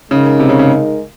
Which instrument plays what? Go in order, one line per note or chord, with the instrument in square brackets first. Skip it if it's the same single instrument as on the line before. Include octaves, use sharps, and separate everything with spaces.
[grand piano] C#3 [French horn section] G#3 D#4 A#4
[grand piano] C3
C#3
C#3